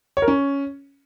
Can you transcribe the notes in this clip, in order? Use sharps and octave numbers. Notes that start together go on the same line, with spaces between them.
C#5
A#4
C#4